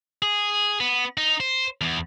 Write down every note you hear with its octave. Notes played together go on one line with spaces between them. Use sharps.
G#4
B3
D#4
C5
E2